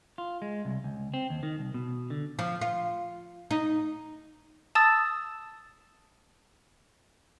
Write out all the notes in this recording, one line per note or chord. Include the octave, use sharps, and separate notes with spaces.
F4
G#3
C2
C#2
C4
D#2
D#3
C2
B2
D3
F3
F4
D#4
A5 D#6 E6 A6